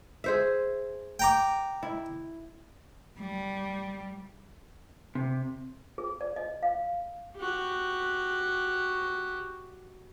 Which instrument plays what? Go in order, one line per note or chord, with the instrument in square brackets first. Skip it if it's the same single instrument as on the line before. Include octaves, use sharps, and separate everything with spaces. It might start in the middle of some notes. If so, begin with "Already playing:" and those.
[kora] G#4 C5 E5
[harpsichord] G5 A#5 D6
[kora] E4
[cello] G3
[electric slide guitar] C3
[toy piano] G#4
D5
D#5
F5
[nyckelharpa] F#4 G4